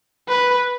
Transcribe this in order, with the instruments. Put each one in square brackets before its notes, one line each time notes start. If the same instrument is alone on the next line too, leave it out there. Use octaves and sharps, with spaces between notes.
[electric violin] B4